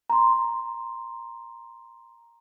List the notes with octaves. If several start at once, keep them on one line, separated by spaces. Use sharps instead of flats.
A#5 C6